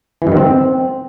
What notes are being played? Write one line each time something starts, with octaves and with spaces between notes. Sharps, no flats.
E3
G2
D#3
C4